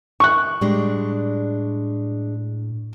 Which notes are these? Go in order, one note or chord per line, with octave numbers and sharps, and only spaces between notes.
E5 C#6 F#6
A2 G3 G#3 D4